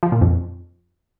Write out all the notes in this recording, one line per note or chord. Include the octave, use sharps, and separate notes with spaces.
F3
A#2
F2